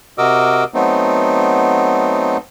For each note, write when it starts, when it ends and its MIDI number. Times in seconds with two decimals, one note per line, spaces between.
0.18 0.64 48
0.18 0.64 66
0.18 0.64 70
0.18 0.64 75
0.18 0.64 86
0.18 0.64 88
0.74 2.37 54
0.74 2.37 57
0.74 2.37 59
0.74 2.37 60
0.74 2.37 63